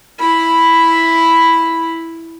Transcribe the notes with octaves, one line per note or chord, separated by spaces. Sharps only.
E4 B5